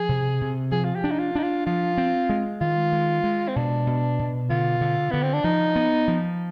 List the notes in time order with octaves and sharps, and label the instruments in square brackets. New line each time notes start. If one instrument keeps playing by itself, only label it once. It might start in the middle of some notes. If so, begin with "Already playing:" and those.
Already playing: [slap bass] F3 [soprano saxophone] G#4
[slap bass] C3
C3
[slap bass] F3 [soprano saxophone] G#4
[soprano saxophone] F4
G4
[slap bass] D4
[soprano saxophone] D#4
F4
[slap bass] D4 [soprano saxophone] D#4
[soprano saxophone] F4
[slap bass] F3 [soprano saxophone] F4
[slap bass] C4
G#3
[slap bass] D#3 [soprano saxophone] F4
[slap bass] G#3
G#3
[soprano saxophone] C4
[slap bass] B2 [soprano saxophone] D4
[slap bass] B2
B2
[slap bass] D3 [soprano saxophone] F4
[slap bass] D3
[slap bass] D3 [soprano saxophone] B3
[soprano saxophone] C4
D4
[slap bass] F3 [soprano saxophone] D#4
[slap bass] B3
F3